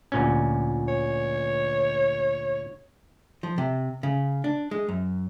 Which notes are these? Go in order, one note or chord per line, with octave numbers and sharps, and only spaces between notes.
D2 A#2 C#4
C#5
F3
C3
C#3
D4
G#3
F#2